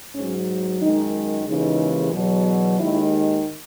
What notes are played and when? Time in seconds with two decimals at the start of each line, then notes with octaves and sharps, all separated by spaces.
0.15 G#2 F#3 C#4
0.81 F#2 D#3 G#3 D#4
1.47 D#2 C#3 E3 G#3 D#4
2.13 E2 B2 F#3
2.79 D#2 D#3 G#3 E4